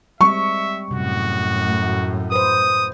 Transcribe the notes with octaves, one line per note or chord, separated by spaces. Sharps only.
G3 G#3 C4 E5 C#6
F#2 A2 C3 G3 F#4
A3
B4 C5 D#6